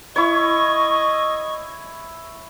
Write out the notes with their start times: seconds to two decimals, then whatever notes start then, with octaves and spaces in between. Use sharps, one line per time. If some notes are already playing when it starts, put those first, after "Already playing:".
0.16 E4 C#5 D#5 C#6